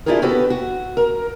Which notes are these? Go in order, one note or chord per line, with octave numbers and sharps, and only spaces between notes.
D4 E4 F4 G4 G#4 A#4
B3 F#4 G4 A4 B4
F#4
A#4